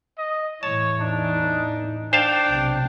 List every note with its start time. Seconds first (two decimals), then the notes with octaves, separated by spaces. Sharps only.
0.18 D#5
0.63 E2 A2 E3 C#5 A5
1.00 D4 D#4
2.13 D4 C5 F5 G5 A5
2.48 B1 C3